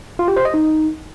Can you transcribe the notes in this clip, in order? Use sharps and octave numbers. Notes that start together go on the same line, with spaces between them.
F4
G4
C5
D#5
D#4